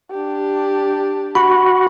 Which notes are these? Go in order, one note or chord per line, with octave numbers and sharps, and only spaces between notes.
D4 G4
F#4 B5